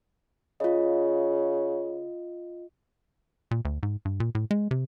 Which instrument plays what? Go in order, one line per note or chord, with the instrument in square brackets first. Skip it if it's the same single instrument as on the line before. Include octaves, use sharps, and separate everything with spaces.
[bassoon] C#3 [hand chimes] F4 D#5
[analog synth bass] A#2
D2
G#2
G2
A#2
A2
G#3
C3